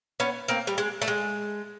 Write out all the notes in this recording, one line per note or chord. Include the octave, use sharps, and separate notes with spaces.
B3 C#4
A#3 C4
G3
G#3
A3
G#3